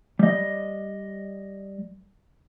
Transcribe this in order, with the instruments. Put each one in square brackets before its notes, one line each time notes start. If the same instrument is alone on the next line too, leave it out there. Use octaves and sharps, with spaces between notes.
[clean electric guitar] G3 D#5